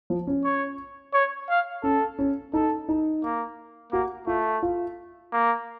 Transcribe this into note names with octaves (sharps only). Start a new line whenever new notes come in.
F3
C#4
C#5
C#5
F5
C#4 A4
C#4
D#4 A4
D#4
A#3
A#3 F#4
A3 F4
F4
A#3